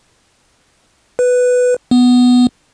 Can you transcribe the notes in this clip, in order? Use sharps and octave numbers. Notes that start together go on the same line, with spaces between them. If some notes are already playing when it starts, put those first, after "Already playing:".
B4
B3